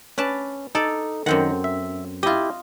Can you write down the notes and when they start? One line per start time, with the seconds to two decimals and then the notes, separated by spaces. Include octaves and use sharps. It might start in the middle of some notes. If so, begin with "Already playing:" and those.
0.18 C#4 B4 D5 A5
0.75 D#4 A4 D5
1.26 F#2 D#3 C4 F#5
1.64 E5
2.23 E4 F4 G4 D#5